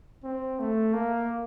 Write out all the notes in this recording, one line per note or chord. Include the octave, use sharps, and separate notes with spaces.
C4
A3
A#3